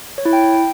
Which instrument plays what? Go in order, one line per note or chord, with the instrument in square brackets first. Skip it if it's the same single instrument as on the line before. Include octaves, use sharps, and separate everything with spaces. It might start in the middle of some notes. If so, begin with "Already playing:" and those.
[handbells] C#5
E4
G5